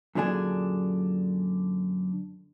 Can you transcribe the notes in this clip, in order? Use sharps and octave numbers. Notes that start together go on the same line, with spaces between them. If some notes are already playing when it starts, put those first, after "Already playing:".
F#2 A#2 D3 D4 G#4